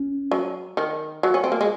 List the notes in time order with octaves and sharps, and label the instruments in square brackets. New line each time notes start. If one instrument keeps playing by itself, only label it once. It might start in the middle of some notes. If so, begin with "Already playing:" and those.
Already playing: [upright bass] C#4
[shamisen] F#3
D#3
F#3
C#4
C4
A#3
G#3